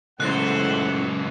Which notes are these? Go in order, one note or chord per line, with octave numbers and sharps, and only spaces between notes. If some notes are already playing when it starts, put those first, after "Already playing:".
C#2 F#2 A2 C#3 E3 C5 F#5 F#6